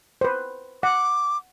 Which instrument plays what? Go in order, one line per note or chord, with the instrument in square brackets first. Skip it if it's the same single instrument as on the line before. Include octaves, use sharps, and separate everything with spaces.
[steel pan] B4 C5
[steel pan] F#5 [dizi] D6